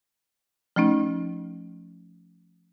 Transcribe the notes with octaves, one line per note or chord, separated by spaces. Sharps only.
F3 A3 C#4 D#4